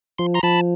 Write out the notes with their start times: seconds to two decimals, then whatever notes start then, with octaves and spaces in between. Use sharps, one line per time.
0.18 F3 C6
0.34 A#5 C6
0.43 F3 A5 B5